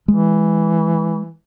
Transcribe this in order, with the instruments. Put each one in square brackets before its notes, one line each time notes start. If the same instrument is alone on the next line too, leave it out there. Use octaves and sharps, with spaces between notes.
[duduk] E3 [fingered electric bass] G#3